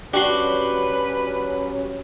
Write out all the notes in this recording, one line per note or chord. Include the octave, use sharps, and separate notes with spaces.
F#3 C#4 D4 F#4 G4 B4 C6